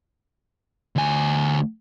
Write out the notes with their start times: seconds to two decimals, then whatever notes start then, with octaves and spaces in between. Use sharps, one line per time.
0.96 D2 G#5